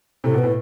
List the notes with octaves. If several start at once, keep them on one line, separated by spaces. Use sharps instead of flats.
A2 C3 A4
B2
B4
A2